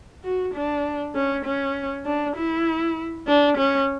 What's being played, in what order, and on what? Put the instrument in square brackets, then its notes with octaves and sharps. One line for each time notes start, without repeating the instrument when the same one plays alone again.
[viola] F#4
D4
C#4
C#4
D4
E4
D4
C#4